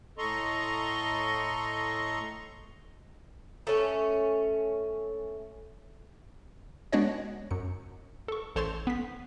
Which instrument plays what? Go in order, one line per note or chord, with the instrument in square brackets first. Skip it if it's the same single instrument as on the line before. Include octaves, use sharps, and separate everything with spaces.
[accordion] A2 A4 D#5 A#5 C6 C#6
[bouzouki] A3 C#4
[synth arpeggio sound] G#3 B3 D4 F#4 C#5 D#5
F#2 C#7
A4 C#6
A1 A4 C5 C#5 C6 A6
B3 B6